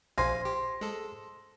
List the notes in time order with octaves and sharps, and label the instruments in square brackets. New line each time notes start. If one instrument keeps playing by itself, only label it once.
[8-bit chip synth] A#1 F5 G#5 [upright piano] C5 C6 A#6
[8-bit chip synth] G4
G#3 A4